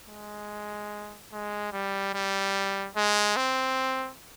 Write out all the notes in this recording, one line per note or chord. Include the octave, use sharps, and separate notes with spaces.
G#3
G#3
G3
G3
G#3
C4